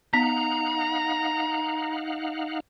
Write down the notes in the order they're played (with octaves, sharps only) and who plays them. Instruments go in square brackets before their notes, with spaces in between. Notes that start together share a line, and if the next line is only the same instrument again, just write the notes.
[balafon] B3 [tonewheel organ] D#4 F5 F#5 [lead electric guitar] A#5